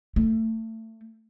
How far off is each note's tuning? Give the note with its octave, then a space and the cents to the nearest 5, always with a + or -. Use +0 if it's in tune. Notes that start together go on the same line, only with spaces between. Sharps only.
A3 +25